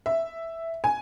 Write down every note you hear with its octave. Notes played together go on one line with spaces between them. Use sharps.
E5
G#5